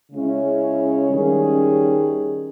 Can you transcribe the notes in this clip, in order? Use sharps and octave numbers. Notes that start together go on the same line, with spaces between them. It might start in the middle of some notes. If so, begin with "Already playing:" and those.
C#3 G#3 C#4 E4
D#3 G3 C#4 G#4